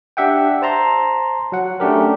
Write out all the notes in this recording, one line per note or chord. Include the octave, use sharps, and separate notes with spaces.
D4 G4 E5 F#5 G5
C5 A5 A#5 C6
F#3 F#5
A3 C#4 D4 G4 A#4